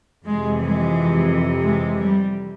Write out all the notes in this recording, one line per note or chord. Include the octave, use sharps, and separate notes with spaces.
F2 C3 E3 G#3
G#3
G#3
G3